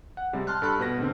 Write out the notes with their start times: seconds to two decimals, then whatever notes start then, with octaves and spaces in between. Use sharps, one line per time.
0.17 F#5
0.33 C3 G3 G#3
0.47 G5 A5 C6 F6 F#6
0.62 G2 A4 A5 B5 F#6
0.79 B2 B4 A#6
0.98 G#2 D3 C4